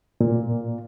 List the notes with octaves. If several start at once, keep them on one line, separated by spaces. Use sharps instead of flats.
A#2